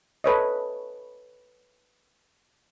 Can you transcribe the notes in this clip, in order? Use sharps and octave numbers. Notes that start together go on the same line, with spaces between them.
A4 B4 C#5 D#5